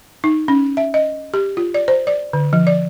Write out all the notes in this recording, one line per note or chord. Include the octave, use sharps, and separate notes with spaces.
D#4
C#4
E5
D#5
G4
F4
D5
C5
D5
D3
F3
D5